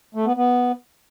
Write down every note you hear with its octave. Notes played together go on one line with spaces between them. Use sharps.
A3
B3
B3